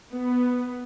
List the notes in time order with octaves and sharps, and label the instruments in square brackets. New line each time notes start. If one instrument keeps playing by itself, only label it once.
[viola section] B3